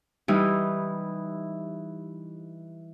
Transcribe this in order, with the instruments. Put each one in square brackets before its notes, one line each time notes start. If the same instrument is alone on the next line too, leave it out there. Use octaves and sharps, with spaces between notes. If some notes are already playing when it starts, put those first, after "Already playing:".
[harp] E3 G3 D#4 E4